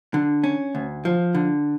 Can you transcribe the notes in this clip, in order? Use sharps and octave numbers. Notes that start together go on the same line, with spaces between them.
D3
C#4
D2
F3
D3